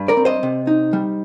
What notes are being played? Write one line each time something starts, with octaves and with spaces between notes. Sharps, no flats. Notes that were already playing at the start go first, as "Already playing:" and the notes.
Already playing: G2
A#4 D5
C4
C5 D#5
C3
D#4
G3